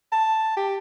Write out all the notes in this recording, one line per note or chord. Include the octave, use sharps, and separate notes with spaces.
A5
G4